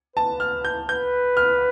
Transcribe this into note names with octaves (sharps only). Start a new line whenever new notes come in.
B4 A5
F6
G6
B4 G6
F6